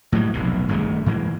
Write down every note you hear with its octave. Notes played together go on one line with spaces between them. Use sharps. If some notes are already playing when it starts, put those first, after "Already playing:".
A2 F#3 G3
F1 B1 A2
G#1 G2 G#3 A3
G#2 E3 G#3 A#3